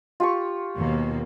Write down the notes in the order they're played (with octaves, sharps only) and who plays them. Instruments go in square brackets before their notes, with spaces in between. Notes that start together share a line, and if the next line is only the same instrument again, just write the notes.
[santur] F4 G4 C#6
[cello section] D#2 B2 A#3